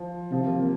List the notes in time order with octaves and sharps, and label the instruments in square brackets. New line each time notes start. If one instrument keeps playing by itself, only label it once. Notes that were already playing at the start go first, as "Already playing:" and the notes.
Already playing: [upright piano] F3
[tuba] C3 [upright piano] F3
[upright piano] A#3
A#3